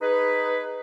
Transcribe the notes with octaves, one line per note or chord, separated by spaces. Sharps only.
D#4 G#4 B4